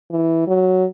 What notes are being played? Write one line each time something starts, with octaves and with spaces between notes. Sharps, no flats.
E3
F#3